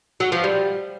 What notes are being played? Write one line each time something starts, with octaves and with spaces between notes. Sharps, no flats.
F#3
F3
G3